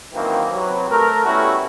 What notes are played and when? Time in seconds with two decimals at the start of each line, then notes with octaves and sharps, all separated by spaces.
0.13 F#2 D#3 E3 A#3 C4
0.51 C3 F#3 B4
0.90 A3 A#4
1.24 G3 A3 B3 C#4 E4 F#4